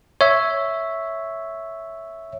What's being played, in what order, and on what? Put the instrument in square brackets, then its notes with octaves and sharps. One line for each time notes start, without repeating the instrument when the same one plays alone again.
[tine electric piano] C#5 E5